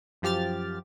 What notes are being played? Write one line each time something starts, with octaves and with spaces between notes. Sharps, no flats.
F#2 F3 G4 F6 A6